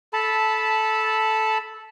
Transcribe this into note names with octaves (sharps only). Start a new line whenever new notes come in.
A4 A5 B5